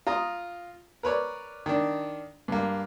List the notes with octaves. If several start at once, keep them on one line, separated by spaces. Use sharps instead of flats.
F4 A#5 D#6
A#4 B4 C#5 D5
D#3 D4
G2 A#3